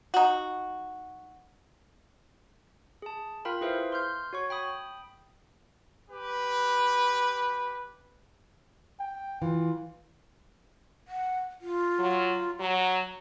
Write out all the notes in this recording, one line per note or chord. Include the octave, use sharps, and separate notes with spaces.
D#4 F#4
G#4 A5
F4 A#4 F5 G5 B5
E4 G#4 B4 C5 E5 F5
C6 F6 G6
F#4 C#5 C#6
G5 B5 D#6
G4 B4
G5
E3 F4
F#5
F4
F#3
F#3 A#5